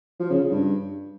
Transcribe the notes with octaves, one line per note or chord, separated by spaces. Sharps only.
F3
C#3
C#3
G2